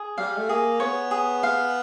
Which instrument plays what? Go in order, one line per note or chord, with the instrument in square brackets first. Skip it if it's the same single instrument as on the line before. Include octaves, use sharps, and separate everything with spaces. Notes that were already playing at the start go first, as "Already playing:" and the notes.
Already playing: [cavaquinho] G#4
[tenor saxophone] G3 [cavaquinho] F5
[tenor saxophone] A3
[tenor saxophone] A#3 [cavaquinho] G#4
[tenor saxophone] B3 [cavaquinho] C#5
[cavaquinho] G#4
F5